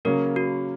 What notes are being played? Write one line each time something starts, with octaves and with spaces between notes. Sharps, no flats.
C#3 F#3 A#3 C#4 A#4
F#4